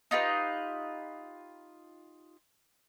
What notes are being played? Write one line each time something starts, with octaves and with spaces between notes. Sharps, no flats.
D#4 F4 G4 B4